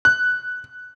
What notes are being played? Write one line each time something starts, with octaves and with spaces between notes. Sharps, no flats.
F#6